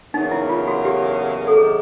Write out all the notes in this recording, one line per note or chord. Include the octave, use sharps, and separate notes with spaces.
E2 C#3 F#3 A#3 D#4
E4
F4
F#4
G4
A4
C3 D#3 F#3 G#4